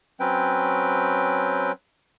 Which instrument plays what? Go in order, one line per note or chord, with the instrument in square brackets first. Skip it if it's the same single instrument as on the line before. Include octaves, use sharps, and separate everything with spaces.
[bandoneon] F#3 C4 C#4 B4 G5